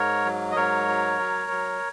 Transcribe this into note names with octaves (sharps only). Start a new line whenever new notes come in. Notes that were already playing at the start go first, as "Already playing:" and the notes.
Already playing: G#2 A#4 C#5
F#3
D#5
G#2 A#4 C#5
F#3
F#3
F#3